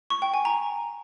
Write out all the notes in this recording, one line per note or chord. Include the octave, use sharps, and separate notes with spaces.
C#6
G5
G#5
A#5